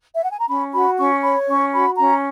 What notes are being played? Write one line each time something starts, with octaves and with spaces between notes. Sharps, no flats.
E5
F#5
G#5
A#5
C#4 B5
F#4 B5
C#4 C#6
C#5 B5
C#4 C#6
F#4 B5
C#4 A#5